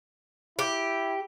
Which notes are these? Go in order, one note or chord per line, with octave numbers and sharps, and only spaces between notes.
E4 G4